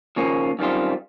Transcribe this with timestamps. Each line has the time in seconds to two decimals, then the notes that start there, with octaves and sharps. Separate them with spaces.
0.16 D#2 C#3 F3 A#3 C#4
0.59 F#2 D#3 G3 C4 F4